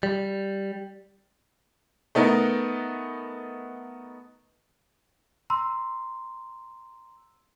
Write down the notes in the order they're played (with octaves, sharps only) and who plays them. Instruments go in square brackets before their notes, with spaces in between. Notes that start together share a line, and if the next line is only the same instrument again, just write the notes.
[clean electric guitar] G3
[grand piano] A3 B3 D#4 A#4
[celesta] A#5 C6 E6